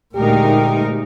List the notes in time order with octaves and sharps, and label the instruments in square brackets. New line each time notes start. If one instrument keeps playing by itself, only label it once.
[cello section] D2 D#4 A#4 [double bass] A#2 G#3 [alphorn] G4